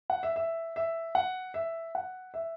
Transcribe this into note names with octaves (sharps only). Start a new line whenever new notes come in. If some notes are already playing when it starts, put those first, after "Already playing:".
F#5
E5
E5
E5
F#5
E5
F#5
E5